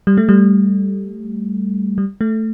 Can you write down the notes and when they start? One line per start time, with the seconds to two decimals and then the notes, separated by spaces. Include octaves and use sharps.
0.07 G3
0.17 A3
0.29 G3
1.98 G3
2.21 A3